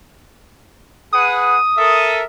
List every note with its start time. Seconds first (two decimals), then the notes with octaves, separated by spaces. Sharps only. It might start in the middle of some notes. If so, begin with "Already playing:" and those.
1.13 G#4 B4 F#5 D#6
1.77 A4 A#4 E5